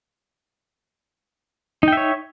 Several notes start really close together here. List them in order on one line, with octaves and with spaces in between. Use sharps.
D#4 G5 E5 C#5